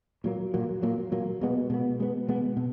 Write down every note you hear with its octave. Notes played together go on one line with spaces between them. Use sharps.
A#2 F#3 A#3
A#2 F#3 A#3
A#2 F#3 A#3
A#2 F#3 A#3
B2 G#3 B3
B2 G#3 B3
B2 G#3 B3
B2 G#3 B3
B2